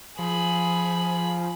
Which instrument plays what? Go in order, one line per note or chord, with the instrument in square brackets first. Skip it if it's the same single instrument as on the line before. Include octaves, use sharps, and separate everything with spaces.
[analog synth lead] F3 [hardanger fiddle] G#4 B5